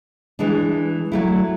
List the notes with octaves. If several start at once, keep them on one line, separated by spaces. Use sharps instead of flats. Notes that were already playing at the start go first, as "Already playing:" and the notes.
E3 G#3 D4
F#3 A3 E4